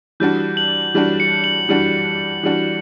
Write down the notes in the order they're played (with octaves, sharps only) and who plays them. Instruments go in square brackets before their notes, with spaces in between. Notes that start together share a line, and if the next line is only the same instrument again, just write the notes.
[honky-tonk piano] E3 G3 D4 F#4 [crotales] G6
[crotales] F#7
[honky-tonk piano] E3 G3 D4 F#4
[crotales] C#7
F#7
[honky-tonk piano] E3 G3 D4 F#4
E3 G3 D4 F#4